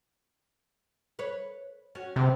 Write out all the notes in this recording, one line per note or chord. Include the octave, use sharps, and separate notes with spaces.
B4 C#5
C#4 F#4
C3 G#3 B3 C4